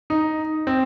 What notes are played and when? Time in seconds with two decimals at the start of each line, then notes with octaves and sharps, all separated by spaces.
0.10 D#4
0.67 C4